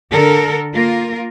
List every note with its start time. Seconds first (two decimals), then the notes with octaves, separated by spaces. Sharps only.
0.11 D3 A4 A#4
0.74 A#3 F4 A#4